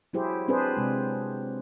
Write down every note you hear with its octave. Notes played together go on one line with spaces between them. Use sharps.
F#3 E4 G4 G#4 C5
C4 D4 G#4 B4 C5
C3 G#3